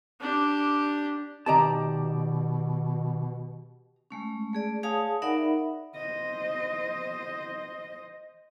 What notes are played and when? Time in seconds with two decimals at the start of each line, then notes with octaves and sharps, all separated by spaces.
0.21 D4 G4
1.46 B2 D#3 G4 D5 D#5 A5 A#5
4.10 G#3 A3 C#4
4.53 A3 G#4 D5
4.83 G#4 C#5 F5 G#5 A5 D#6
5.22 D#4 A#4 D5 E5 F#5 B5
5.95 C5 D#5